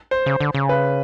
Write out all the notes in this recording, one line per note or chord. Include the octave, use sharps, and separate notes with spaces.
C5
C#3
D3
C#3
B4